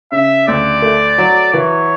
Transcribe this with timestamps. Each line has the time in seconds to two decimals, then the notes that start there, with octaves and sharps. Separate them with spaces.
0.12 C#3 E5
0.48 D2 D5
0.82 A3
1.18 F#3
1.53 E3 C#5